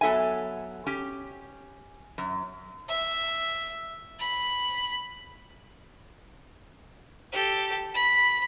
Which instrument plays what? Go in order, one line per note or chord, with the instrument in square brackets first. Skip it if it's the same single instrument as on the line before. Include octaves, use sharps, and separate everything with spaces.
[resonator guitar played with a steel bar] F#3 B3 A4 E5 G#5
C#4 G4
F#2
[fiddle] E5
B5
G4 A4
B5